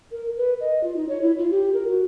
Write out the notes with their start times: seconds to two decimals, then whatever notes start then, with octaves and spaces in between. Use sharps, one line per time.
0.12 A#4
0.37 B4
0.60 D#5
0.84 F4
0.96 D#4
1.09 C#5
1.21 E4
1.39 F4
1.51 G4
1.74 A#4
1.88 F#4